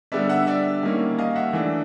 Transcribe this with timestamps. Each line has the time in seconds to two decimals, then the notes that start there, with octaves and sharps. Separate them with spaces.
0.12 D3 G3 B3 D5 E5
0.29 E5 F#5
0.47 D5 E5
0.83 D#3 G3 A#3 C#4
1.18 D#5 F5
1.36 E5 F#5
1.53 E3 A3 D4